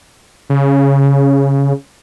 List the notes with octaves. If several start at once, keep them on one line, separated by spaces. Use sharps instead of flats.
C#3